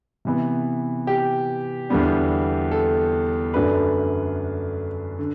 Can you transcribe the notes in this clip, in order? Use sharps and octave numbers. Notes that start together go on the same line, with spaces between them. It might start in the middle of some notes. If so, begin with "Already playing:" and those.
C3 E3 B3
G4
E2 D3 G3 B3 D4
A4
F#2 D3 A3 D4 B4
D3